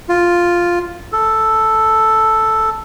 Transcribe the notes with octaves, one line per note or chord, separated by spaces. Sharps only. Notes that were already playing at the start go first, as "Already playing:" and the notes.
F4
A4